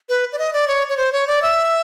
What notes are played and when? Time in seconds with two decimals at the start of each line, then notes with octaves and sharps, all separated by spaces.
0.09 B4
0.33 D5
0.39 D#5
0.53 D5
0.68 C#5
0.89 C#5
0.97 C5
1.13 C#5
1.27 D5
1.42 E5